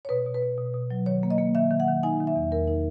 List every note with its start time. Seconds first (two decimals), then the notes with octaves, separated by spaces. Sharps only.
0.05 C#5
0.09 B2 B4
0.26 B2
0.34 B4
0.42 B2
0.58 B2
0.74 B2
0.91 F#3
1.06 D#3 C#5
1.23 A#3
1.30 D#5
1.38 A#3
1.55 D#3 E5
1.71 D#3
1.80 F#5
1.88 D#3
2.03 D#4 G#5
2.20 D#3
2.27 E5
2.36 E2
2.51 E2 A#4
2.68 D#4